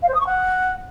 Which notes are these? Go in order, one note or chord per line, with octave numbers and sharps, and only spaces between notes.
F5
C5
D#6
C#6
F#5